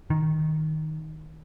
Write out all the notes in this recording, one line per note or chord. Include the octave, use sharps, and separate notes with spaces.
D#3